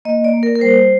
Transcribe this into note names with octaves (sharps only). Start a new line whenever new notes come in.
A#3 D#5
D5
A#3
A#4
A#4
G3 C5